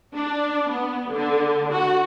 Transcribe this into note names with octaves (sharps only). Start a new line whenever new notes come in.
D4
B3
D3
F#4